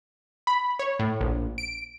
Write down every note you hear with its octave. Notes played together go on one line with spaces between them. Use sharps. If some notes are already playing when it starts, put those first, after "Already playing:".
B5
C#5
A2
A#1
D7